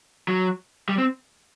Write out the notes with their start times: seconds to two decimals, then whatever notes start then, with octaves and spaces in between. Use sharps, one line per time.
0.28 F#3
0.89 G3
0.98 C4